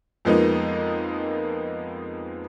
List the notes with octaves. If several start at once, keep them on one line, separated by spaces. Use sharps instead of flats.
F2 F3 G#3 A#3 B3 D#4